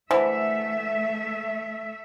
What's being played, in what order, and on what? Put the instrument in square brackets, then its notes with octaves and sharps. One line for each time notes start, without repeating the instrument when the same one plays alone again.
[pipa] D3 E3 G#3 [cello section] A3 E5 [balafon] C5 B5